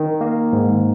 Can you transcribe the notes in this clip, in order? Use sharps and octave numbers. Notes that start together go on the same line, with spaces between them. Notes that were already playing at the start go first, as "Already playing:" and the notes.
Already playing: D#3
A#3
G#2